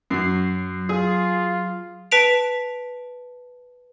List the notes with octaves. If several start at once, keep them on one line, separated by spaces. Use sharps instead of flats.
F#2 F#3 C7
F4 G#4
B4 A5 B6 D7 F7